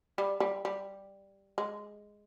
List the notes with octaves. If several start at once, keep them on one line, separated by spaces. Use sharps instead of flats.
G3
G3
G3
G#3